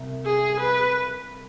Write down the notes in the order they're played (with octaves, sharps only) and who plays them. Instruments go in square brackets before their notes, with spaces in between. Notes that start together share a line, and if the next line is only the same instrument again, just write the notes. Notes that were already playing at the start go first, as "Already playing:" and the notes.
Already playing: [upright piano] C2
[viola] G#4
B4